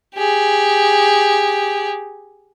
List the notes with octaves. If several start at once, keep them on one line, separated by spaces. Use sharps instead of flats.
G4 G#4